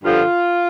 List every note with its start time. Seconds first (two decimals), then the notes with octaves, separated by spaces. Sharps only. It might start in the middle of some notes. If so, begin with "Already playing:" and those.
0.04 G2 D3 F3 F4